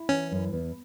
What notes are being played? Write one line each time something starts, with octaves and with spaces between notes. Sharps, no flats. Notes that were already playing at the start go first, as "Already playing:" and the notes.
Already playing: E4
E3 C#4
F#2
E2